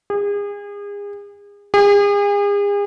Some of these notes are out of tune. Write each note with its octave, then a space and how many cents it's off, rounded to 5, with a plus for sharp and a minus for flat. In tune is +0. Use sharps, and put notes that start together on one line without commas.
G#4 -35
G#4 -40